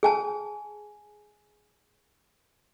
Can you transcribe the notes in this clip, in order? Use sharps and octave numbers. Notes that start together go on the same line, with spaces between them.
G#4 G#5 A5